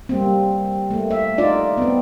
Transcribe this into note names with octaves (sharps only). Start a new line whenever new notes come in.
G3 A#3 C4
A3 A#3
E5
D#4 F4 D5
B3 C4